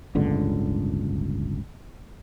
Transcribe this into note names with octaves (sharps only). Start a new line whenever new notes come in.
D1 G1 C#2 D3